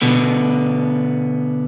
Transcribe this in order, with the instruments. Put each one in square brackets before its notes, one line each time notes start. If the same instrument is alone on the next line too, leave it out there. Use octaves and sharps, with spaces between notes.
[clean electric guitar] B2 D3 B3